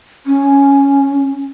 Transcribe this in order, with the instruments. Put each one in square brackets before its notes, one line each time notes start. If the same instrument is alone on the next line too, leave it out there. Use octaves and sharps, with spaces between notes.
[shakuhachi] C#4